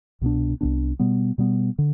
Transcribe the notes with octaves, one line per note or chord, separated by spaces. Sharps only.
C2 B2 B3 D4
C2 B2 B3 D4
B2 G3 B3
B2 G3 B3
D3